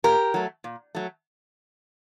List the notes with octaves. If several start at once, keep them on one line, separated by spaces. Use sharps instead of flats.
A#2 G4 A#4
F#3 A3
A#2
F#3 A3